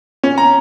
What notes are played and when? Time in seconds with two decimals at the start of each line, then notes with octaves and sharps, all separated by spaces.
0.24 C#4
0.38 A#5